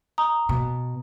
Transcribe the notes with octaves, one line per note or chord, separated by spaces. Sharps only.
A#5 D#6
B2